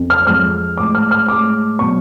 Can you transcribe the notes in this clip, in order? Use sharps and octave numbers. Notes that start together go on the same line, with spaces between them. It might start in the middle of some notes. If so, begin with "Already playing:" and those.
Already playing: F2
F6
F2 F3 G#3 F6
A2 G#3 D6
F6
F6
A2 G#3 D6
B2 F#3 C#6